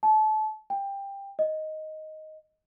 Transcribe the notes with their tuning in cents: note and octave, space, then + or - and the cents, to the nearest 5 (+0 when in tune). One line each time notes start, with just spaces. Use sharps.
A5 -30
G5 +15
D#5 +5